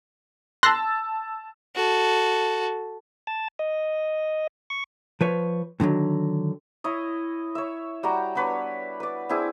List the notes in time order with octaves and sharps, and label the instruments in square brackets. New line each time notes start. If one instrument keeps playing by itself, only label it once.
[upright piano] A5 E6 A6 [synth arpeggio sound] C6 F#6 A#6
[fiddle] F#4 A4
[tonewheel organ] A5
D#5
C#6
[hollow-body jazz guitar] F3 B4 C#5
A2 D3 D#3 F#3
[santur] E4 C#5 D#5
C#5 E5
G3 F#4 G5 A#5
B3 D4 B4 C#5
B4 D5
C4 D4 E4 G#4